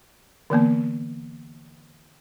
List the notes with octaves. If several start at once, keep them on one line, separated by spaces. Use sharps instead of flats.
D3 E3 A#3 B3